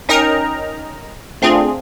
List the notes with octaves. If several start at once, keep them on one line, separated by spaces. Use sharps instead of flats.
C#4 D#4 A#4 D#5 G5 A#5
A3 C4 D4 F4 G#4